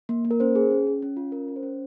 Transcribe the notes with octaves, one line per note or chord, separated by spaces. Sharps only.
A#3
A#3
A#4
C#4 C5
G#4
C#4
C#4
C#4
F4
C#4 A#4
C#4
C5
C#4